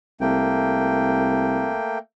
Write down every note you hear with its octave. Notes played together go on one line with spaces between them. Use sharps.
C2 A3 A#3 G5